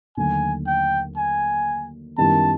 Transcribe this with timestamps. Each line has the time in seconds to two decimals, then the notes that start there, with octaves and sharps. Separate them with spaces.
0.17 D#2 D3 F#3 A3 G#5
0.67 G5
1.17 G#5
2.18 F#2 D#3 G3 B3 E4 A5